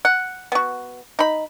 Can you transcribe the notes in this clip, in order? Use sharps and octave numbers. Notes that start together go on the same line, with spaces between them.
F#5
B3 F#4
D#4 B5